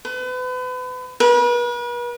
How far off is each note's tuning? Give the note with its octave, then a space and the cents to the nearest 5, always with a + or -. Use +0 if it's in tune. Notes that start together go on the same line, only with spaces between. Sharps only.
B4 +35
B4 -40